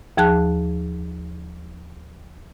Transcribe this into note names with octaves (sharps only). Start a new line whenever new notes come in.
D#2 F3 G#4 A5 F#6